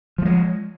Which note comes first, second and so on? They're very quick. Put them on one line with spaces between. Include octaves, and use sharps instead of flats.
F3 A3 G#3